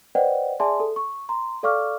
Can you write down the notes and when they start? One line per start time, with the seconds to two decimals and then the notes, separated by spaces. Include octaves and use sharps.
0.15 B4 C5 D5 D#5 F#5 G5
0.60 G#4 D5 E5 G#5 A5 C6
0.80 A4
0.96 C#6
1.29 A#5 C6
1.63 A4 D5 F5 C#6 D6 F6